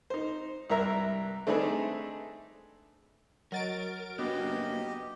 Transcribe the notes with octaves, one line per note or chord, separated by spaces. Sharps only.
D#4 C5
C2 G2 A#4 E5 A#5
A3 C4 D4 D#4 G#4 B4
F#3 A#4 D#5 F#5 A6 D7
F#3 A#3 B3 D4 F#4 G4 D#5